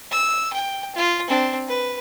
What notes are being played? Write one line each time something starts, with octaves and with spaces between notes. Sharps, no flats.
E6
G5
F4
C4 D4
B4